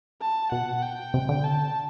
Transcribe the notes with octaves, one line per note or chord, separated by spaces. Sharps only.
A5
B2 F#5
G5
C3
D3
A5